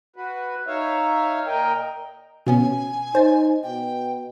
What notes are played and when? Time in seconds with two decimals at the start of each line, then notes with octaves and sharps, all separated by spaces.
0.16 F#4 B4
0.67 D#4 C#5 E5 F5
1.47 A#2 A#4 D#5 G5
2.47 B2 B3 C#4 G#5
3.15 D#4 C5 A6
3.63 B2 G5